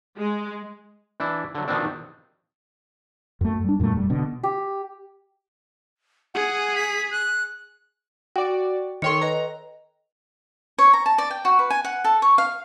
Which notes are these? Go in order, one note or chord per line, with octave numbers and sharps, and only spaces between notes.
G#3
E3 D4 E4
D3 F#3
B2 D#3 F3 B3 C4 D4
F#2 A3
G3 D4
F#2 A#2 G3 A3
F1 G3
B2 D3
G4
G#4 F#5 G#5
B6
F#6
F#4 D5 G5
D#3 A4 C#5 G5 C6 C#7
B4 D#5 A#5
C#5
A#5
A5
D5
G5
F#4
B4
G#5
F#5
A4
C#5
F5